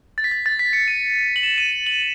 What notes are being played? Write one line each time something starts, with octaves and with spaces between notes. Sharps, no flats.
A6
B6
A6
A6
B6
C#7
D#7
F#7
E7
D#7
F#7